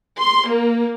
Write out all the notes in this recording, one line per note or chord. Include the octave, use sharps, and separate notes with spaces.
C6
A#3